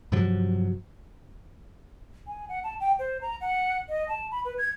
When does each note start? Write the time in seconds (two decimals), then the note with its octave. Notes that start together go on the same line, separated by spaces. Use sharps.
0.12 G2 C3 F3 F#3
2.27 G#5
2.49 F#5
2.64 A5
2.80 G5
2.99 C5
3.22 A#5
3.41 F#5
3.89 D#5
4.08 A5
4.31 B5
4.45 B4
4.58 G#6